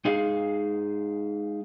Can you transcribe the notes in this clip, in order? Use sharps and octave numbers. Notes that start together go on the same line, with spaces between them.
G#3 D#4 G#4 F5